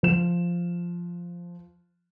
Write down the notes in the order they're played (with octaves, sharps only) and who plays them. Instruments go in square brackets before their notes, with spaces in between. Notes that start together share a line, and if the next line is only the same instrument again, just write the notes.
[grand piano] F3 E7